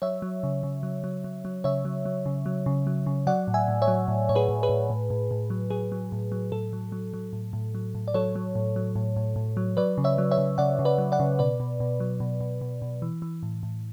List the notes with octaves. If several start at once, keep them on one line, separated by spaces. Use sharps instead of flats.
F#3 C#5 E5
F#3
C#3
C#3
F#3
F#3
F#3
F#3
C#3 C#5 E5
F#3
F#3
C#3
F#3
C#3
F#3
C#3
F#3 D5 F#5
A2
E5 G#5
A2
C#5 E5
F#3
A2
A2 C#5
G#4 B4
A2
G#4 B4
A2
A2
A2
A2
F#3
F#3 G#4
F#3
A2
F#3
A2 A4
F#3
F#3
F#3
A2
A2
F#3
A2
D5
F#3 A4 C#5
F#3
A2
F#3
A2
A2
A2
F#3
F#3 B4 D5
C#3
C#5 E5
F#3
C#5 E5
C#3
C#3 D5 F#5
C#3
B4 D5
F#3
D5 F#5
C#3
B2 B4 D5
B2
B2
F#3
B2
B2
B2
B2
E3
E3
A2
A2